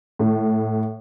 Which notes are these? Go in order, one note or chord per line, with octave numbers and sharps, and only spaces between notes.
A2